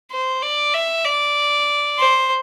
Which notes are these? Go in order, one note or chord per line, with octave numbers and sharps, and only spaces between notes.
C5
D5
E5
D5
C5